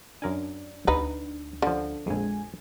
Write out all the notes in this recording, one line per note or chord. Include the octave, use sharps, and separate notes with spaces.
F#2 D4 A#4 G#5
D2 B3 D#4 B4
D3 F3 C#4
A#1 F2 G#3 G#5